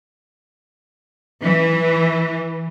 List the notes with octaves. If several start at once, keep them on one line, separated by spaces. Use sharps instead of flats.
E3